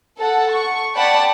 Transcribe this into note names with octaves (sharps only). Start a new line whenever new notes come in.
A4 F#5
C#6
D5 F#5 G5 A5 B5